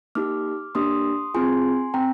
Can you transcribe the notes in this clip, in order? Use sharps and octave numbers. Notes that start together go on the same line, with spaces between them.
A#3 D#4 G4 D6 F6
A#3 D4 G4 C6 D#6
C4 F4 G#4 G#5 C6
C4 G5 A#5